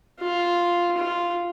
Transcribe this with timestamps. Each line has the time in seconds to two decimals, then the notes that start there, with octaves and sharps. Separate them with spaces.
0.19 F4
0.97 F4